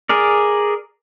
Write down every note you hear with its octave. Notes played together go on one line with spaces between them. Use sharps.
G#4 A#4 D5